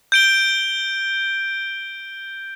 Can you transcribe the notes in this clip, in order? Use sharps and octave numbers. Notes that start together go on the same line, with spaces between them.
G6 D7 G7